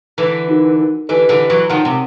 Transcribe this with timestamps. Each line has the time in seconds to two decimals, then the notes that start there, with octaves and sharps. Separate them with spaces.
0.18 D3 E3
0.48 D#4 F#4 A#4
1.09 D3 E3 G4 B4 D#5 G#5
1.29 D3 E3
1.50 E3 F#3
1.70 D#3 F3 F#4 A#4 C#5 F#5
1.85 C3